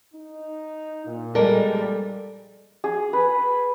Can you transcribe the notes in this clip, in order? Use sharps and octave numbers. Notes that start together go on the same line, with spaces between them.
D#4
A#2
G3 G#3 A4 A#4 D5
A#1 A#2
G#4
B4